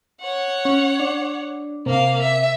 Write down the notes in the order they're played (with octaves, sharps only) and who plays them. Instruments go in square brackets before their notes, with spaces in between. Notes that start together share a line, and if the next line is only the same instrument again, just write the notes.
[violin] C#5 F#5
[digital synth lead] C#4
D4
[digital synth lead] C3 [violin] A#3 F5
[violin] E5